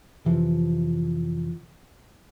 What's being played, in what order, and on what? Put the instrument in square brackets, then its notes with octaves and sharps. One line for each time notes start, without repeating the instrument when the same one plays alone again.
[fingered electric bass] F2 C3 E3 F3